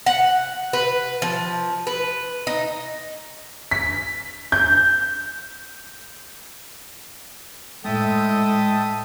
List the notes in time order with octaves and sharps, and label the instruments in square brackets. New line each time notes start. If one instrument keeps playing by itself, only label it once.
[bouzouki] F#5
B4
F3
B4
D#4
[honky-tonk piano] B6
G6
[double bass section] A2 [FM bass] G#3 [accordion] A4 D#6 [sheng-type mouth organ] E5 G5 A5